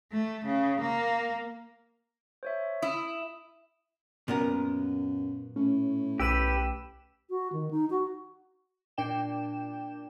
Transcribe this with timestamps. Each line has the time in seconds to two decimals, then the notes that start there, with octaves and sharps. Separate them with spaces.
0.12 A3
0.45 C#3
0.81 A#3
2.43 C5 C#5 E5
2.82 E4 D#6
4.28 F#2 A#2 B3 A#4
5.56 A2 C#4
6.20 B1 G4 B4 E6 E7
7.30 F#4
7.53 D#3
7.71 D#4
7.90 F#4
8.98 A#2 D4 D5 G5 E7